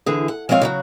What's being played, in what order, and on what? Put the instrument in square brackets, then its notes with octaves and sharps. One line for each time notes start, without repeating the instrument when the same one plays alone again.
[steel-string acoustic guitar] D3 E3 G#4
F#5
F3 G#3 C4 C#5 F5
C#3 F#3 F#4